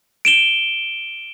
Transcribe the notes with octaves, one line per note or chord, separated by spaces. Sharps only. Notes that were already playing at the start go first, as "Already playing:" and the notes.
D7 E7 G7